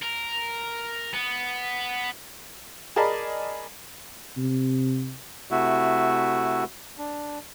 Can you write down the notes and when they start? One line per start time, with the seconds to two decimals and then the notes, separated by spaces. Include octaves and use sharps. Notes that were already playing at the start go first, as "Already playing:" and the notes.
0.02 A#4
1.14 B3
2.96 G#4 A#4 D5 D#5 A5 B5
4.37 C3
5.51 C3 A3 E4 F#4
6.98 D4